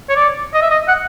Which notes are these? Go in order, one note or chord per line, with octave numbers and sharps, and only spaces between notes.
C#5
D5
D#5
E5
D#5
F#5